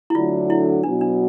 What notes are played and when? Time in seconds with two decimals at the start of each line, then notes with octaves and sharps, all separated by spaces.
0.10 E4
0.15 D3 F#3 A3 D4 F4
0.50 E4
0.83 B2 F#3 B3 D4
1.01 D4